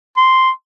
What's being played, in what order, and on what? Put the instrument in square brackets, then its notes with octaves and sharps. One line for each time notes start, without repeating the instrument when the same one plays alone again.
[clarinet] C6